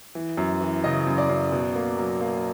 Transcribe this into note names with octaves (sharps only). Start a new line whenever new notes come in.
E3
F#2
E3
C#3 D#5
F#2
D5
F#2
B2
A#3
F#3
A#3